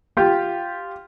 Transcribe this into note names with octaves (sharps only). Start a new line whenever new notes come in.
F4 G4